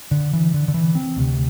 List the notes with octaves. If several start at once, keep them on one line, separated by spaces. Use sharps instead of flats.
D3
E3
D3
D3
E3
C4
D2 C3